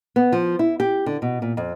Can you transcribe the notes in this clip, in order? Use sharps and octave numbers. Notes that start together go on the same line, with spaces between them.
B3
F3
E4
G4
D3
B2
A#2
F2